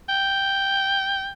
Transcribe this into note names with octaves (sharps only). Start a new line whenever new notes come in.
G5